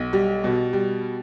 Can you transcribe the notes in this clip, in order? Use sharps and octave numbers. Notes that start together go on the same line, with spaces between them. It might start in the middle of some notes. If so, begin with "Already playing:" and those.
Already playing: B1
G3
B2
G3